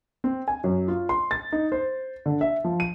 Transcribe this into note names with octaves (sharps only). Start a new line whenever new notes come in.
C4
G#5
F#2
F4
C6
A6
D#4
C5
D3
E5
F3
D#7